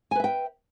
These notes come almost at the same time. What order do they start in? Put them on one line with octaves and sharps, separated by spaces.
G#5 B4 E5 G5